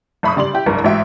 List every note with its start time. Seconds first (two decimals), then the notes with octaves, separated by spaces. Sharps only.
0.23 F#1 E5 B5 C#6 D#6
0.36 C#3 G3 D5 C6 F#7
0.53 E4 G4
0.66 F#1 C2 G2 A#4
0.84 A1 G#2 F#4 G4 E5 D7